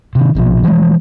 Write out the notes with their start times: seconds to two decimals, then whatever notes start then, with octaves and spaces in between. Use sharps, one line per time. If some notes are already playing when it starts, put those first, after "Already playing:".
0.15 C3 D#3
0.35 A#1 B2 D#3 F3
0.64 E3 F3 G3 G#3